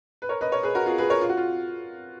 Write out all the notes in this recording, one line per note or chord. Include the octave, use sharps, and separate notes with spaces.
B4
A#4 C#5
B4 D#5
A#4 C#5
G#4 B4
F#4 A#4
F4 G#4
G#4 B4
A#4 C#5
F4
F#4
F4